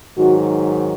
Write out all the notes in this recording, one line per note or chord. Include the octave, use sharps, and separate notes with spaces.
G#2 D#3 F#3 F#4